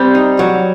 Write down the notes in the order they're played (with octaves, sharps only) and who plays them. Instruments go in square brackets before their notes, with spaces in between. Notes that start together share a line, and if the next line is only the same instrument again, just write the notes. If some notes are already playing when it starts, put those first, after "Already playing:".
Already playing: [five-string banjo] G3 [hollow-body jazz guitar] C4
[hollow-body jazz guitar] D#4
F#3